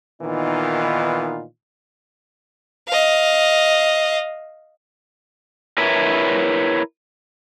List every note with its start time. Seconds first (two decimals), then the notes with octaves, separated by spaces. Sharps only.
0.22 A#2 D#3 E3 B3 D#4 F4
2.88 D#5 F5
5.78 E4 A#4 B4 C#5 E5